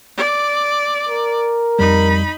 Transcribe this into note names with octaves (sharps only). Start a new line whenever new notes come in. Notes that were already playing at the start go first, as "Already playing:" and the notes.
D5
A#4
F2 G3 D#4 B5